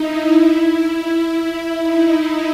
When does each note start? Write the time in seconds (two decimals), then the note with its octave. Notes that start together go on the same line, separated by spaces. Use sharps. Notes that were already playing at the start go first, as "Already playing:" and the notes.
Already playing: D#4 E4
0.33 E4
1.77 D#4